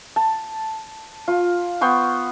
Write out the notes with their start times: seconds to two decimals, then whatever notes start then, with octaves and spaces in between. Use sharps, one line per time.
0.16 A5
1.28 F4
1.81 B3 G5 C6 C#6